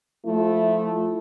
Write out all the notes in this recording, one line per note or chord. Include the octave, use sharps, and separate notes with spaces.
F3 A3 E4